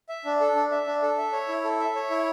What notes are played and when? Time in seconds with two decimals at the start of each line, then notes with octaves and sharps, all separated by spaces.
0.09 E5
0.25 D4
0.40 A4
0.56 D4
0.71 E5
0.87 D4
1.02 A4
1.18 E5
1.33 C#5
1.48 E4
1.64 A4
1.79 E5
1.95 C#5
2.10 E4